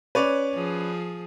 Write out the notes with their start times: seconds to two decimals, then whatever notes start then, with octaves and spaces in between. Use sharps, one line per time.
0.15 C#4 B4 C#5 D5
0.54 F3 G#4